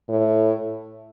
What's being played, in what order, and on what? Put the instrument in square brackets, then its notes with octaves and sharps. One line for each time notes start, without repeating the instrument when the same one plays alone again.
[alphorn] A2